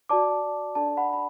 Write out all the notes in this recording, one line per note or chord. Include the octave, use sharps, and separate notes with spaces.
F#4 D5 A5 D6
D4 A4 D5 A5
F#5 B5
B5